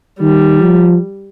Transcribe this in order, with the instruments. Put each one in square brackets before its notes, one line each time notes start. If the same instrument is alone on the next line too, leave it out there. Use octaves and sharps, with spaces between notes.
[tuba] D#3 [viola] G3
[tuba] F3